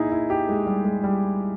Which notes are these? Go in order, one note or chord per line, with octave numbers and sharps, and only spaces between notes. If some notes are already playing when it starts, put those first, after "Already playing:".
Already playing: A#2 D#4 E4 G#4
E4
G4
G#3
G3
G#3
G3